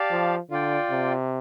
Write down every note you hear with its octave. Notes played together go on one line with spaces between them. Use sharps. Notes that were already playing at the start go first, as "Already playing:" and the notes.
Already playing: G4 D5 F5 A5
F3
D3 F4 D5 G5
C3